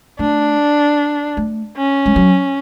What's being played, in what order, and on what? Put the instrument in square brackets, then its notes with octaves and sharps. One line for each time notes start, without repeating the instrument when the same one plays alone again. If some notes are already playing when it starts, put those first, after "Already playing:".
[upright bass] A3 [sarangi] D4
[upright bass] A3
[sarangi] C#4
[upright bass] G#3
F#3